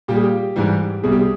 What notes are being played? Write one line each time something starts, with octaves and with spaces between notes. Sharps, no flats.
A#2 G3 G4
G#4
G4
G#2 E3 G3
C2 B2 G3 G#4
G4
G#4